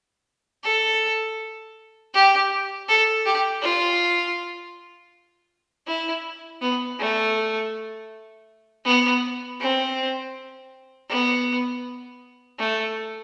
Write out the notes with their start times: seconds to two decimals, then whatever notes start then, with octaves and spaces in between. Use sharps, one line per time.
0.64 A4
2.14 G4
2.89 A4
3.26 G4
3.63 F4
5.88 E4
6.61 B3
7.00 A3
8.85 B3
9.60 C4
11.10 B3
12.59 A3